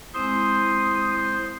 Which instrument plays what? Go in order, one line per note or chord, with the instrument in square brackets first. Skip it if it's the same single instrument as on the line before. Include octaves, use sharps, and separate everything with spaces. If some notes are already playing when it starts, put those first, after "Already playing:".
[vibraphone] G#3 C4 E4 [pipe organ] C5 C6 [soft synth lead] D#6